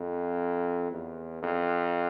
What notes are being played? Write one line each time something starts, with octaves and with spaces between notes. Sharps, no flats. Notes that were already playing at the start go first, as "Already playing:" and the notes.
Already playing: F2
E2
F2